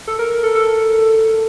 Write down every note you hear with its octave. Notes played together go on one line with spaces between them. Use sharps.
A4
A#4
A#4
A4
A4